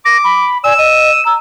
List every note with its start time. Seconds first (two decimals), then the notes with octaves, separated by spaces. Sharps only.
0.05 D6 A#6
0.24 B5
0.64 D5 G#5 E6
0.78 D#5 D#7
1.25 A#5 E6